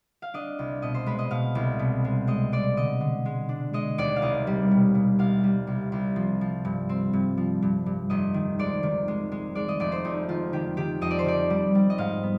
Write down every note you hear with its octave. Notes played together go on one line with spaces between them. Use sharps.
F5
D4 D#5
C2
B2 D#5
C5
G#3 B4
D#5
B2 F5
C2
B2
G#3
G#3 D#5
G#3 D5
D3 D#5
D3
G#3
D4
G#3 D#5
D#2 D5
F5
C2 D#5
G3
B2
B2
C2 F5
G3
C2
C2
F3
F3
G2
C4
G2
F3
G2
G2
F1 D#5
D#3
G#3 D5
D#3
G#3
G#3
G#3 D5
D#5
F1 D5
C5
F2 D#4
D#3 F4
D#3 G4
D#3 G4
F2 D#5
D5
C5
D#3 D5
G3
G3
D#5
G#2 F5
B3